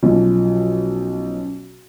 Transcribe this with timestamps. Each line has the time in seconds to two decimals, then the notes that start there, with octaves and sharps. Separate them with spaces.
0.03 B1 F3 C#4